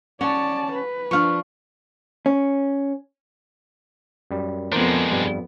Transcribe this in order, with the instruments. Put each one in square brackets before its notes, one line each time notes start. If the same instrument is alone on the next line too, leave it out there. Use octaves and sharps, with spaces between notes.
[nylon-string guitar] C#4 [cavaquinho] F#4 [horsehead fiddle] D5 A5
[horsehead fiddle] B4
[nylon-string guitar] F3 D4 [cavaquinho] F5 C#6
[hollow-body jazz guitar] C#4
[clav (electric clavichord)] F#2 G3
[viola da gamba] F2 B3 [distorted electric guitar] G#3 D4 [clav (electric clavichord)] A#4 C5
[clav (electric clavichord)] G2 G3